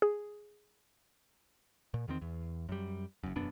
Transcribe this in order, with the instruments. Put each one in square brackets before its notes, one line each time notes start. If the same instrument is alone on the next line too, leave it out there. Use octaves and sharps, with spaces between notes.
[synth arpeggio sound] G#4
[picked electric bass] A#2
E2 D#3 C4
E2
F#2 G3
F#1 F#2
E1 F#2 B3 D4